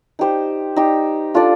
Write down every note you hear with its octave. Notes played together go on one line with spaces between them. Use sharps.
D#4 G4 C5
D#4 G4 C5
D4 F4 A4 D5